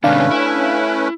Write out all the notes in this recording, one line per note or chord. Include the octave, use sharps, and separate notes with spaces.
G#2 C3 D#3 A3 C#4 D4 B4 F5
E4